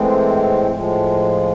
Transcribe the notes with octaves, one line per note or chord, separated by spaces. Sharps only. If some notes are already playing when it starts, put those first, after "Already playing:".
Already playing: A2 E3 G#3 C4
A2 F3 G#3